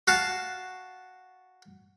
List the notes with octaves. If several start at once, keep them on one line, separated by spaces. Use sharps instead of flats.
F#4 F5 A5